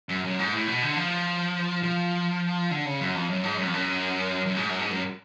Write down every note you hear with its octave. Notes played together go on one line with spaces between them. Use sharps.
F#2
F#2
G#2
A2
B2
D3
F3
F3
D3
C#3
F#2
F2
F#2
G#2
F#2
F2
F#2
F#2
G#2
F#2
G#2
F#2